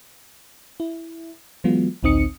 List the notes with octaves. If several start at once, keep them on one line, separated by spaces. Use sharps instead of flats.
E4
E3 F#3 G#3 B3 F4
A1 D2 C4 D#4 D#6 C#7